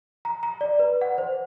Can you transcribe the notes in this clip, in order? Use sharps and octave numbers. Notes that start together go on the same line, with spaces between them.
A#5
A#5
D5
B4
F#5
C5